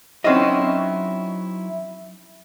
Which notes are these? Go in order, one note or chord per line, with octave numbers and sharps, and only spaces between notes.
F#3 C4 C#4 D#4 E4 D#5